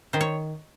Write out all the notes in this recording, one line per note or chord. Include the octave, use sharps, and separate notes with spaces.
D#3 C5
C#5